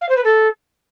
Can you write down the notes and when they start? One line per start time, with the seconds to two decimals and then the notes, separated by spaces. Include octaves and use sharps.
0.01 F5
0.09 C5
0.16 B4
0.24 A4